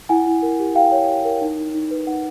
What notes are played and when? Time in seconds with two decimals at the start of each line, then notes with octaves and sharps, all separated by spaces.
0.09 E4 F#5 G#5
0.26 E4
0.42 A#4
0.59 G4
0.75 G4 F5 G5
0.92 C#5
1.09 G4
1.25 A#4
1.41 D#4
1.58 D#4
1.74 D#4
1.91 B4
2.07 D#4 F#5